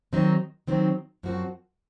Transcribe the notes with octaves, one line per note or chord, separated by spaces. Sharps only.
D#3 F#3 C4 D#4
D#3 F#3 C4 D#4
F#2 F3 C4 F#4